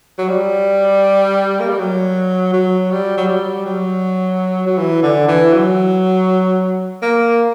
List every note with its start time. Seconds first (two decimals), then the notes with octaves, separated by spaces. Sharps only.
0.18 F#3
0.29 G3
1.60 A#3
1.69 G3
1.79 F#3
2.53 F#3
2.91 G3
3.17 F#3
3.28 G3
3.66 F#3
4.66 F#3
4.78 E3
5.03 D3
5.28 E3
5.53 F#3
7.02 A#3